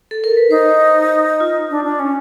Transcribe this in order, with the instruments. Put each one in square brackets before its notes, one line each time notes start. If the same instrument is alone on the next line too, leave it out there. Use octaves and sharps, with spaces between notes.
[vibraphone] A4
A#4
B4
[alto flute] D#4 [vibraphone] C5
[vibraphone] F4
[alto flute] D4
D4
C#4